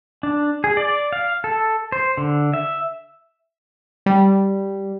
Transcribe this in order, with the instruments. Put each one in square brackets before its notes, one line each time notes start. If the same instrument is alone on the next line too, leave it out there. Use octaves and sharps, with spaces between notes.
[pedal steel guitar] D4
G#4
D5
F5
A4
C5
D3
E5
[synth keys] G3